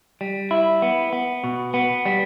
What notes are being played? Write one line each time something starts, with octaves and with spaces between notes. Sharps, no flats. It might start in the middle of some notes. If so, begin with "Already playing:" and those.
G3
E4
B3
B3
B2
B3
G3